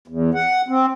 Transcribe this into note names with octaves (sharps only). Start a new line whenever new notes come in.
E2
F#5
C4